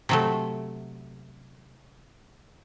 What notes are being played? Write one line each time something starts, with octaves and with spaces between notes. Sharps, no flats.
C3 F#3 A3